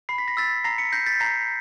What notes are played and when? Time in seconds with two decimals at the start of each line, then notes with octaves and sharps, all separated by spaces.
0.09 B5 C7
0.18 B6
0.28 A#6
0.37 E6 A6 B6
0.64 A#5 A#6 C7
0.78 B6 C#7
0.93 G6 A#6 C7
1.06 A6 B6
1.20 A#5 A#6 C7